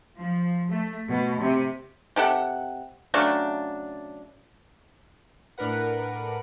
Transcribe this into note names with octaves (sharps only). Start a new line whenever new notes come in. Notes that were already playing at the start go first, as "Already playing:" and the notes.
F3
A3
B2
C3
C3 G4 A4 F#5
C#3 F#3 A3 D4
A2 D4 A#4 B4 F#5